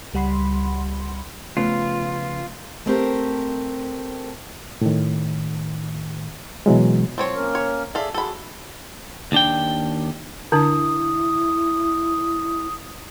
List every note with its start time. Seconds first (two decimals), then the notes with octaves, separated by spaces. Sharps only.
0.14 C#2 G3 F#5 B5 C6
1.57 C#3 F3 A3 B3 F4
2.86 A3 C4 G4 A#4
4.81 A2 D#3
6.66 B2 E3 F#3 G#3
7.18 F3 C4 C#5
7.35 A#3 C#4 A#4
7.55 C#5
7.95 G#4 A4 D5 E5 F5
8.14 F#4 G#4 A4 B5
9.32 D#2 D4 G5
10.52 D3 D4 E4 D#6